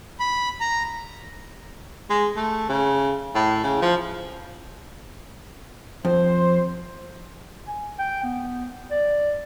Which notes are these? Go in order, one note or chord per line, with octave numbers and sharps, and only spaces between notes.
B5
A#5
G#3
A3
C#3
A2
C#3
F3
F2 C5
G#5
G5
B3
D5